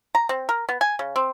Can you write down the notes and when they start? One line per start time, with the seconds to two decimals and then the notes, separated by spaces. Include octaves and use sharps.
0.15 A#5
0.29 C4
0.49 A#4
0.69 B3
0.81 G#5
0.99 C#3
1.16 C4